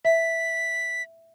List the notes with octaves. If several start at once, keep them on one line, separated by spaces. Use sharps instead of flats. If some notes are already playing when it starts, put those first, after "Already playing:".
E5 B6